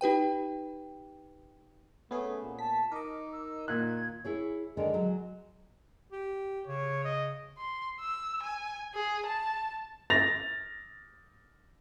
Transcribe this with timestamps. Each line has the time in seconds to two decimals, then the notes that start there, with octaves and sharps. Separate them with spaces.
0.01 D#4 G4 B4 G5
2.11 A3 B3 C#4 G#4
2.42 A#2
2.59 A5 B6
2.92 D#4 A#4 D#5 D6
3.32 E6
3.68 A#2 D#3 F#6 G#6
4.25 E4 G#4 C#5
4.77 D3 D#3 G#3 D4
4.94 F#3
6.12 G4
6.67 C#3 C#5
7.05 D#5
7.57 C6
8.00 E6
8.43 G#5
8.94 G#4
9.26 A5
10.10 A6 A#6 F7